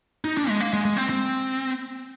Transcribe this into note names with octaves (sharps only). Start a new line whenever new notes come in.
D#4
D4
G#3
A#3
G#3
G#3
C4
C4